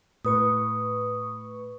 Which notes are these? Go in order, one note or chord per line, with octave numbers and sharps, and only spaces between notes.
A2 B4 C#6 D#6